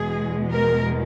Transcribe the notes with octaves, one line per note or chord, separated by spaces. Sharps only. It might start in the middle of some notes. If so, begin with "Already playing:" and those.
Already playing: E2 B2 G#3 G#4
A#4